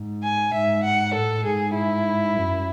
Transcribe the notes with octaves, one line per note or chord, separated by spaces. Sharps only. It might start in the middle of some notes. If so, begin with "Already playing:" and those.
Already playing: G#2
G#5
G#2 E5
F#5
A2 A4
G#2 G#4
E4
F#2